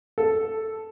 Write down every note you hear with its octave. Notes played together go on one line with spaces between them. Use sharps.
A4